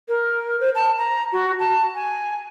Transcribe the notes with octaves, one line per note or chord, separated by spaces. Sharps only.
A#4
C5
A5
A#5
F#4
A5
G#5